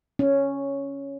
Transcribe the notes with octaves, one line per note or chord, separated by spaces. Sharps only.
C#4